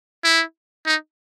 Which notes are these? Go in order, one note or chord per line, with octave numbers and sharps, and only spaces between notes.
E4
D#4